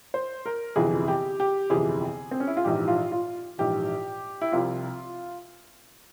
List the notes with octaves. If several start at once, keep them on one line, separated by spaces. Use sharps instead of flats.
C5
A#4
G1 F2 C3 E3 G#4
G4
G4
G1 F2 C3 E3 G#4
C4
C#4
E4
F4
A#1 G#2 E3 G4
F4
F4
A#1 G#2 E3 G4
E4
C2 C3 F3 F4